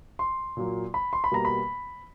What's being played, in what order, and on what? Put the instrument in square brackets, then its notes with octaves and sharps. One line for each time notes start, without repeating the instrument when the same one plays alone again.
[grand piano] C6
A#2 F#3 A#3
B5
C6
B5
B2 G3 A#3 A#5
B5